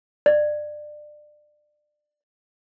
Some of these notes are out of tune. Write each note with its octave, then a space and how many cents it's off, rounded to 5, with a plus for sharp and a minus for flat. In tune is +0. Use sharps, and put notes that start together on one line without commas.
D5 +25